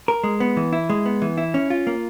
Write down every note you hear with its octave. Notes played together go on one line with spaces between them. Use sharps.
A#4
G#3
B3
E3
E4
G#3
B3
E3
E4
C#4
F4
A#3